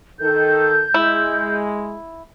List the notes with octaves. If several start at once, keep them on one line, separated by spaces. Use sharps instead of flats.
D#3 A4 G6
G#3 E4